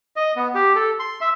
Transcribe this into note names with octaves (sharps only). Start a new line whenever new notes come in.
D#5
B3
G4
A4
C6
E5